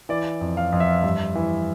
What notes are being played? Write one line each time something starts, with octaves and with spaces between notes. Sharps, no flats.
E3 D5
F2
F5
F2
E5
G2
E3